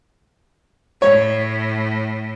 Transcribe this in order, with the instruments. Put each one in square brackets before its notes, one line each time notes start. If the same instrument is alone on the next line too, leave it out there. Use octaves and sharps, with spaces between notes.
[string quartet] A2 [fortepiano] C#5